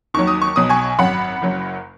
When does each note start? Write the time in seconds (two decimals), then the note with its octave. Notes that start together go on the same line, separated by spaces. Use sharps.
0.14 D#2 D#3 F#3 C#6
0.27 D#6
0.42 C#6
0.56 B1 B2 F#3 D#6
0.70 G#5 C#6
0.98 G#1 F#2 F#3 F#5 B5
1.42 F#1 F#2 F#3